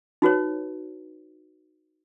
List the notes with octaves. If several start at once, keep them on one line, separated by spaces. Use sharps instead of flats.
D#4 F#4 B4 C#5